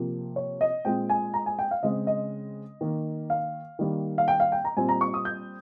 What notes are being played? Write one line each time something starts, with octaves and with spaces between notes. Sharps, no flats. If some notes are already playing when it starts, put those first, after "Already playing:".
Already playing: C3 F3 A#3
C#5
D#5
A#2 G#3 C4 G5
G#5
A#5
G#5
G5
F5
C#3 G#3 C4 D#5
D#5
D#3 A#3
F5
D#3 G3 A#3
F5
G5
F5
G5
A#5
A#2 G3 C4 G#5
A#5
C#6
D#6
G6